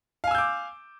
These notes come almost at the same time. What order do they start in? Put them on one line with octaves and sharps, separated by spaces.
F5 G#5 E6 G6 D6